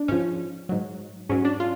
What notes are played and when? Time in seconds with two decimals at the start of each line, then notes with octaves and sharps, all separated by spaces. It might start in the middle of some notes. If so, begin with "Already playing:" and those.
Already playing: D4
0.08 G#2 F3 C#4
0.69 G#2 F#3
1.29 G#2 F#3 C#4
1.45 D4
1.60 F4